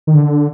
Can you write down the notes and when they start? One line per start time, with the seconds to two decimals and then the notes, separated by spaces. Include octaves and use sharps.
0.07 D#3
0.15 D3